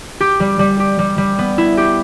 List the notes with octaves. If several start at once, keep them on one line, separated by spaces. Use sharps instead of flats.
G4
G3
G3
G4
G3
G3
B3
E4
G4